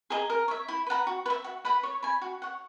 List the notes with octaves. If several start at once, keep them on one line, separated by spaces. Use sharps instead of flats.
G#4 D#5 A#5
A#4
C#5 E5
E4
B4 F#5 A#5
F#4
B4
E5
F#4
B4 F#5 B5
C#5
G#5 B5
F#4
C#5 F#5